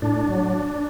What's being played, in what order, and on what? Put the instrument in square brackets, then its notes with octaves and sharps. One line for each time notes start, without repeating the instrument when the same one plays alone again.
[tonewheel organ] A2 D4
F#3